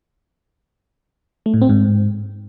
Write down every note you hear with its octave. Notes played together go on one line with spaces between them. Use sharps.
A3
A2
C4
G#2